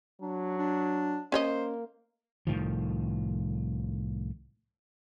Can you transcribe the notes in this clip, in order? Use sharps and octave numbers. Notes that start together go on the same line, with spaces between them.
F#3 D4
D4
A#3 C#4 C5 C#5 D#5
C2 A2 D#3 F3